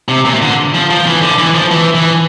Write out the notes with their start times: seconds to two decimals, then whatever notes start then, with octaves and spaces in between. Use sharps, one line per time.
0.08 C3
0.25 A#2
0.42 D3
0.74 F3
0.90 F3
1.06 E3
1.22 D3
1.39 E3
1.54 F3
1.71 E3
1.95 E3